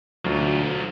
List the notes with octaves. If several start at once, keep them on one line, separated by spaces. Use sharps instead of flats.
D2 F#3 F4